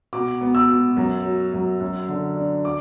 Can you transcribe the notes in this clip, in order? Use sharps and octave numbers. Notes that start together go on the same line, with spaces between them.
B2 D6
B3
E6
B2
F#2
F#3
F#2
F#2
D3
D4
D6